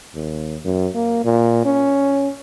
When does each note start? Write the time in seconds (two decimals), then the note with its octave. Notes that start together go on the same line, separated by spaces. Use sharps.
0.15 D#2
0.65 F#2
0.95 A#3
1.24 A#2
1.65 C#4